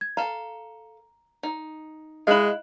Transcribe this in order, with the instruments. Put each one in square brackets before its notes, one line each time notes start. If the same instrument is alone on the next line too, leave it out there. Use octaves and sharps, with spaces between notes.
[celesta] G#6
[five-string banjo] A4 F5 [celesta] A#5
[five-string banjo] D#4
[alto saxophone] G#3 [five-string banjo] E4 F5 [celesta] D#5 F#6 F#7